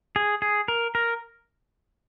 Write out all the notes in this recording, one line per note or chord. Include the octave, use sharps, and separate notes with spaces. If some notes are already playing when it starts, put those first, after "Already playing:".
G#4
G#4
A#4
A#4